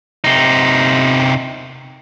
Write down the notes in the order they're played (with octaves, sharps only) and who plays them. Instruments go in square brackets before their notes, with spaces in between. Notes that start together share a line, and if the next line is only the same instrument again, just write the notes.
[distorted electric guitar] C3 D#4